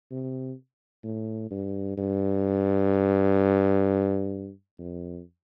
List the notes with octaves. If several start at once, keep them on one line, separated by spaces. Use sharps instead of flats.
C3
A2
G2
G2
F2